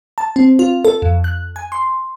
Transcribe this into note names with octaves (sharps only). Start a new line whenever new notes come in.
A5
C4
F4
A4
F2
F#6
G#5
C6